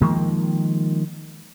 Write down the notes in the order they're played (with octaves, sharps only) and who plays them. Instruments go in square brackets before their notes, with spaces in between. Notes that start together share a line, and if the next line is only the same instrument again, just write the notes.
[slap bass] D#3 F3 G#3 A#3